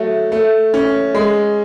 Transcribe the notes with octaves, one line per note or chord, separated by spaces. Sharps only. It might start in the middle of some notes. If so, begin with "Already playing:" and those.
Already playing: F#3 A3
A3
C#4
G#3